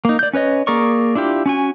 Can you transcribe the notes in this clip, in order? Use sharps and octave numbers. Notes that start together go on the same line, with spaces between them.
A#3 D#4
D5 G6
C#4 B4 C#5 D#5
A#3 G#4 A#4 D5 C#6
D4 E4 F4 G4
C#4 F#4 G#5